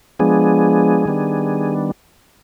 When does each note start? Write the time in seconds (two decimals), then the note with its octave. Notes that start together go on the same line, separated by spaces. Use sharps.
0.19 F3 G#3 B3 D4 G#4
1.05 D#3 G3 B3 D4